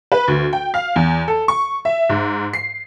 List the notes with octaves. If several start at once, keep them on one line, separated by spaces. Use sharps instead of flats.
B4
D2
G5
F5
E2
A4
C#6
E5
G#2
C7